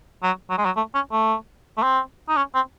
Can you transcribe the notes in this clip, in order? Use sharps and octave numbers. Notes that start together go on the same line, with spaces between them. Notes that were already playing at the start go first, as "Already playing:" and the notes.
F#3
F#3
G#3
F#3
A3
C#4
A3
A3
C4
D#4
C#4
C4